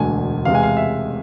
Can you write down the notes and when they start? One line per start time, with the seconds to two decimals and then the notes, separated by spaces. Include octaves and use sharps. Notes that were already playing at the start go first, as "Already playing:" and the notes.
Already playing: E1 D2 D3 G#5
0.45 E2 C3 G#3 F5
0.55 G#5
0.63 F5
0.77 E5